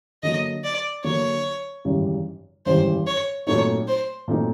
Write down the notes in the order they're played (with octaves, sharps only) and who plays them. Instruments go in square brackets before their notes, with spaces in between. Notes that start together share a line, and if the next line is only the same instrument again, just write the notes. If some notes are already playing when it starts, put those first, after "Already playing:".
[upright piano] D3 F#3 A#3 [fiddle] D#5
[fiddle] D5
[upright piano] D3 F#3 A#3 [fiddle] C#5
[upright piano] G#1 F#2 C#3 E3 G3
[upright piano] G#1 F#2 C#3 E3 G3 [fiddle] C5
[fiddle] C#5
[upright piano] A#2 F#3 A3 C4 D#4 [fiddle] C#5
[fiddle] C5
[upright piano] A#2 F#3 A3 C4 D#4